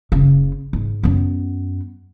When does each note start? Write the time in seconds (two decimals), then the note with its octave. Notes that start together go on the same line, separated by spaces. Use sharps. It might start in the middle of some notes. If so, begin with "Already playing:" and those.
0.12 F#1 C#3
0.73 G#2
1.03 F#2 B3